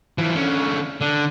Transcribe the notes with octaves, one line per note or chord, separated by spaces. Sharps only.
E3 F3
D3 C#4
D3